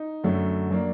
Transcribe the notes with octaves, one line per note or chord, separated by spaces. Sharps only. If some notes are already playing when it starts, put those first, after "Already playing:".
Already playing: D#4
F#2 D3 F#3 A3
F#3 A#3 D4